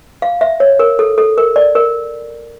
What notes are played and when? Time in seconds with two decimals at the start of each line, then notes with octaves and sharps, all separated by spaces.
0.22 F5
0.41 E5
0.60 C#5
0.79 A#4
0.99 A4
1.18 A4
1.38 A#4
1.56 D5
1.75 A#4